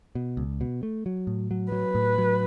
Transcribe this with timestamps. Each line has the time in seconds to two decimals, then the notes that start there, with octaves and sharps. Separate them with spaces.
0.15 B2
0.37 C#2
0.61 B2
0.83 A3
1.06 F#3
1.27 A2
1.51 F#3
1.72 F#3 B4
1.95 A2
2.18 F#3